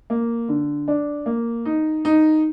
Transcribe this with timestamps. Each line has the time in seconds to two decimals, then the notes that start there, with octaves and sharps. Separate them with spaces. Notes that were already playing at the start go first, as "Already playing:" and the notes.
0.10 A#3
0.49 D3
0.88 D4
1.26 A#3
1.65 D#4
2.05 D#4